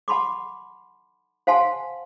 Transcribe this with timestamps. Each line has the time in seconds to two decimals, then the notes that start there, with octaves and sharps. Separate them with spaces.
0.08 F#5 A5 B5 C6 D6
1.47 C5 F5 F#5 G#5 A5 C6